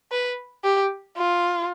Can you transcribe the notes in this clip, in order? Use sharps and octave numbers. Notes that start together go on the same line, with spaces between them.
B4
G4
F4